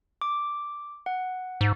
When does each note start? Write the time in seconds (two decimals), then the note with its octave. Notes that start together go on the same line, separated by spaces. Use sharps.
0.21 D6
1.06 F#5
1.61 G#2